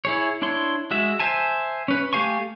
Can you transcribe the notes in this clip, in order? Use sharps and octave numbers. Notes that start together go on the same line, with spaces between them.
E4 G#4 C#5
D4 E4 C#5 C6
G#3 F#4 E5
C5 E5 G#5 A5
C#4 B4
A3 G4 F5 G#5 C#6